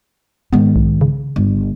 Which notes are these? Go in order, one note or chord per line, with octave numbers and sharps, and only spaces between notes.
G#2 D#3 B3
B1
C#3
G1